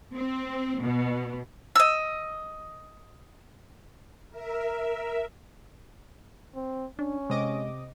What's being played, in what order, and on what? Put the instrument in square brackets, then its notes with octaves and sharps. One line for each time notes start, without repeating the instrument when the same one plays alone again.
[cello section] C4
B2
[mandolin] D#5 E6
[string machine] A#4 E5
[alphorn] C4
[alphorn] C#4 [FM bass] D4
[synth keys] C3 D#5 D6 [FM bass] G#3